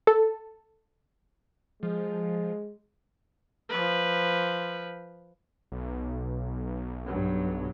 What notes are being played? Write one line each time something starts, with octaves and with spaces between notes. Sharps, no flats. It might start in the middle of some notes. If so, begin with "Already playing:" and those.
A4
F3 G#3
F3 B4
B1
G2 F#3